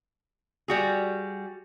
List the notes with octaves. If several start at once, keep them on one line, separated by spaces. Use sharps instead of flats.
G3 F#4 G#4